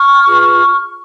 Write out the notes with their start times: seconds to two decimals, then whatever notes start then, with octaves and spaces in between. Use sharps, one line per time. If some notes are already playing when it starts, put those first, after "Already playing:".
Already playing: C#6 F6
0.26 F4 G#4 B4